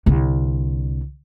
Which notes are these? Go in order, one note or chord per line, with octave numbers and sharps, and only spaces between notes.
C2 D3